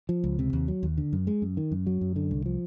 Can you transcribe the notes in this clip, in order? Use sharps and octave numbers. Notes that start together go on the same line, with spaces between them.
F3
C#2
C3
D#2
F#3
D#2
D3
F#2
G#3
F#2
D#3
F#2
F#3
F#2
D3
C2
F3